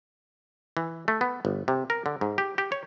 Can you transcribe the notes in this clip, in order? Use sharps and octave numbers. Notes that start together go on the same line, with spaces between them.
E3
A3
B3
G1
C3
A#4
D3
G#2
G4
G4
C#5